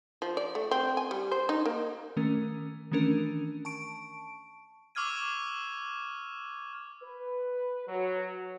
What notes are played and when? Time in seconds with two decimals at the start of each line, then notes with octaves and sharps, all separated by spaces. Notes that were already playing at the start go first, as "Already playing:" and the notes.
0.22 F3
0.37 D5
0.55 A3
0.71 C4
0.97 G#5
1.11 G3
1.32 C5
1.49 D#4
1.66 A#3
2.16 D#3 A3 C#4 A#4
2.92 D#3 E3 A3 C#4 D4 A#4
3.65 A5 C#6 D7
4.95 C#6 D6 E6 F6 G#6 D#7
7.02 B4
7.87 F#3